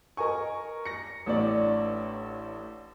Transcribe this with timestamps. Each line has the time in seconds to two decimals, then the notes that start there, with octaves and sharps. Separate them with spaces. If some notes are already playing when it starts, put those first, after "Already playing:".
0.17 A#4 D#5 G#5 C#6
0.85 A#6 C#7
1.26 A1 A2 D4 D5